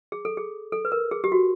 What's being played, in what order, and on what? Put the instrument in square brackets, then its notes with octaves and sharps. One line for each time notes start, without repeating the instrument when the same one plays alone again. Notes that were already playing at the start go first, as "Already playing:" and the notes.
[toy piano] G#4
A4
G#4
A4
B4
A#4
G#4
G4
F#4